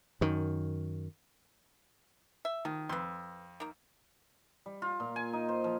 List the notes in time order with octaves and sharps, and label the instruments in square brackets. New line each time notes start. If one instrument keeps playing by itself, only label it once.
[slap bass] F#2 D#3
[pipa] E5
[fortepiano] D#3 [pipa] F3
[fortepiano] F2 [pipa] B4 C6
[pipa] D#3 A#3
[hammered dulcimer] G3
F4
A#2
G#5
D#4
C5
F3